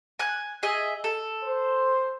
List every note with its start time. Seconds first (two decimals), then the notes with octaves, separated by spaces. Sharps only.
0.19 G#5 F#6
0.63 G#4 D#5 E5
1.04 A4
1.44 C5